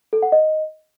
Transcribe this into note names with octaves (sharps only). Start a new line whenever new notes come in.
A4
F#5
D#5